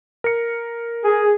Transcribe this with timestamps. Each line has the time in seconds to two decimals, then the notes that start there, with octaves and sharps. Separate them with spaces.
0.24 A#4 C#7
1.04 G#4